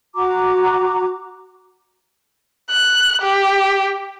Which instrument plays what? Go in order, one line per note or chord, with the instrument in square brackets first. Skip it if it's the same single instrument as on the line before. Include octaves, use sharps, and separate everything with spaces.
[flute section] F#4 A#5 D6
[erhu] F#6
G4